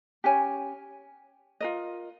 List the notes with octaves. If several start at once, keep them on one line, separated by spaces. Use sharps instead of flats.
C#4 G4 C#5 G#5
F4 A#4 D#5